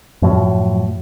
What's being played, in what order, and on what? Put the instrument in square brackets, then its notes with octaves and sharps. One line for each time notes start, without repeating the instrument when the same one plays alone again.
[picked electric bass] F#2 A2 F3 F#3